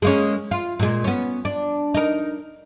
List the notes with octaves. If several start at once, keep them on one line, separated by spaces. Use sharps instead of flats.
G#3 A#3 C#4
F4
A#2 G#3
B3 C#4
D4
D#4 A#4